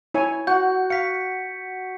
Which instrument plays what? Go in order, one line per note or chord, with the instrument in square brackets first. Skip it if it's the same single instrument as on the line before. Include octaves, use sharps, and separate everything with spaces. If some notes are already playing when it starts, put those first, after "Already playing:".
[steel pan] E4 C#5 G#5
[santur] F#4 [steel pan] F#5 [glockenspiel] G6
[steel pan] F5 [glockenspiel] B6 C#7